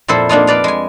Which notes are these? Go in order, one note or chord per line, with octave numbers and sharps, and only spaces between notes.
F2 A#2 E4 A4 C5
A#3 D4 D#4 F4
B4 D5 F5
G#3 G#5